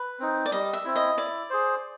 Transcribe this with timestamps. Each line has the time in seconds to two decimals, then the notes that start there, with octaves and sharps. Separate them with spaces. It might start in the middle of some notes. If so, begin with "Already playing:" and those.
Already playing: B4
0.20 C4 D#4
0.46 D5
0.52 G3 D#5
0.73 E5
0.85 C4 E4
0.96 D#5
1.17 E4 D5
1.50 G#4 C5